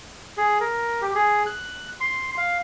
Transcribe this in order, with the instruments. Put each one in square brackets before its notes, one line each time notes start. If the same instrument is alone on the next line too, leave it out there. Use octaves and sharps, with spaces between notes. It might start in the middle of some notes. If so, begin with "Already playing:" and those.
[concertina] G#4
A#4
G4
G#4
F#6
C6
F5